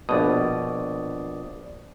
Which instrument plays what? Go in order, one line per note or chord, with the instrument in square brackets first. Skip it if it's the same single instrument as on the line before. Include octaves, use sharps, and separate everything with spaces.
[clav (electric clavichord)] A#1 B2 [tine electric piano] D5 D#6